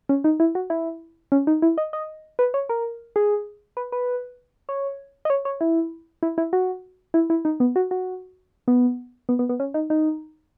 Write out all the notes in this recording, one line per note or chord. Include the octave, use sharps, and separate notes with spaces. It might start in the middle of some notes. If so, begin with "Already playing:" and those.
C#4
D#4
E4
F#4
E4
C#4
D#4
E4
D#5
D#5
B4
C#5
A#4
G#4
B4
B4
C#5
D#5
C#5
C#5
E4
E4
E4
F#4
E4
E4
D#4
B3
F#4
F#4
B3
B3
B3
B3
C#4
D#4
D#4